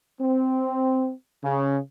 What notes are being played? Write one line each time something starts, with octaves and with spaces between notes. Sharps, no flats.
C4
C#3